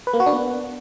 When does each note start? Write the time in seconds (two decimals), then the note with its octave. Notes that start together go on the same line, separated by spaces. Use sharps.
0.07 B4
0.13 A#3
0.20 F#4
0.26 D4
0.33 B3